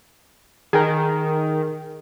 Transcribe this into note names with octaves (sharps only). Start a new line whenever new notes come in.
D#3 G#4 A#4